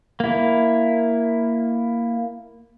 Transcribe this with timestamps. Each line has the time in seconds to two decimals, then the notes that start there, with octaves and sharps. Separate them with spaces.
0.20 A#3 E4